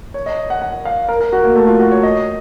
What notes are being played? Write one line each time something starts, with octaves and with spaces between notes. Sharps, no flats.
C#5
D#5
F#5
F#5
F5
A#4
A#4
F#4
A#3
A3
F4
F#4
C#5
D#5